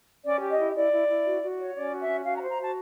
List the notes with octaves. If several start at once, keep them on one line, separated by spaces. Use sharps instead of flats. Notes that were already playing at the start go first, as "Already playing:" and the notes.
C#4 D5
G4
D#5
E4
E4 D5
E4
E4
F#4
F#4
C#5
C#4 D5
F#4
E5
C#4
F#4 F5
A#5
C5
A#5
F#4 A5